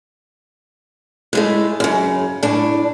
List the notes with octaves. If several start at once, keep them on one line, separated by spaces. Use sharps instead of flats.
A2 G#3 A3
F#2 C#3
A2 D4